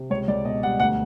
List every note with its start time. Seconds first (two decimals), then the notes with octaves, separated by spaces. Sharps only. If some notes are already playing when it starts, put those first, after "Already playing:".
Already playing: C3
0.10 C#2 C#5
0.28 C#2 D5
0.45 B2 D#5
0.63 G3 F#5
0.80 D2 F#5